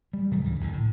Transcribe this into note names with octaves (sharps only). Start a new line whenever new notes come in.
G3
C3 D#3 F#3 A3
D2 G2 C#3 E3
A#1 A2 D3
A2